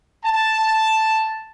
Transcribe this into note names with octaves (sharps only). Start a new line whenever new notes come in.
A5